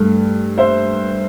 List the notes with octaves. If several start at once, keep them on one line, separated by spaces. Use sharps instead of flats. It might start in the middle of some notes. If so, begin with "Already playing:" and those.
Already playing: G2 A3
C5 E5